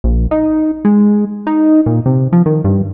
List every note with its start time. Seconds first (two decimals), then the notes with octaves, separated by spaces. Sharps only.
0.04 A#1
0.31 D#4
0.85 G#3
1.47 D#4
1.86 A#2
2.06 C3
2.33 F3
2.46 D#3
2.64 G2